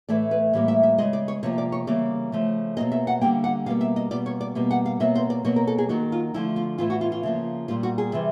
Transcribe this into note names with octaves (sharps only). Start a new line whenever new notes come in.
A2 E3 A3 D5
B4
A2 E3 G3 A#3
E5
E5
C#3 E3 G#3 D#5
D5
C#5
C3 F3 A#3 C#5
D5
C#5
C#3 E3 G3 A#3 D5
C#3 F3 A3
B2 F#3 A#3 D#5
E5
F#5
D3 G3 A#3 G5
F#5
B2 G3 A#3 F5
E5
D#5
B2 G3 A#3 D5
C#5
D5
B2 G3 A#3
F#5
F5
B2 F#3 A#3 E5
C5
D5
B2 F#3 A#3 C#5
A#4
A4
G#4
D#3 F#3 A#3 F#4
F4
D3 F3 A3 E4
F4
A2 E3 A3 F4
F#4
F4
F4
C#3 F3 A#3
A#2 G3 A#3 F4
F#4
G#4
C3 E3 G3